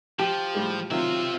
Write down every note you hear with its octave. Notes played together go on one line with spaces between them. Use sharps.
F3 G4
A2 G3 G#3
C3 D#3 F#3 C4 F4 E5